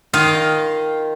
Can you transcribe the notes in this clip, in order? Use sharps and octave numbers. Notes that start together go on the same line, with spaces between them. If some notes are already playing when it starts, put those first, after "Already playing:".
D#3 D#4 F4 D#5 F5